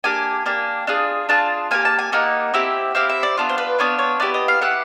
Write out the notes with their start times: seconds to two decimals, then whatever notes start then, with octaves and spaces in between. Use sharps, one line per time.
0.04 A#3 D4 G4 G#5
0.46 A#3 D4 G4
0.87 D4 F4 G#4
1.29 D4 F4 G#4 A5
1.71 A#3 D#4 G4 G#5
1.85 A5
1.99 G#5
2.12 A#3 D#4 G4 F#5
2.54 C4 E4 G4
2.95 C4 E4 G4 F5
3.09 E5
3.23 D5
3.37 B3 D4 F4
3.49 C5
3.58 B4
3.79 B3 D4 F4 C#5
3.99 C#5
4.20 B3 E4 G4 D5
4.34 D#5
4.48 F5
4.62 B3 E4 G4 F#5